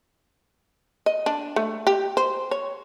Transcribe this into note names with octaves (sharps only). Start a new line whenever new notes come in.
D#5
D4
A3
G4
C5
C#5